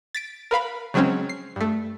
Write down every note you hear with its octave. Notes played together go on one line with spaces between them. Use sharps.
A6 B6 D7
A#4 B4 F5 B5
C#3 F#3 G#3 C4 C#4
C7
G2 A3